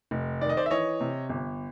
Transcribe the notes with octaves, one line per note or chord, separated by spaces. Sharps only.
F1
D#3 D5
D#5
C5 D5
E5
E3 C#5 D#5
C3
G1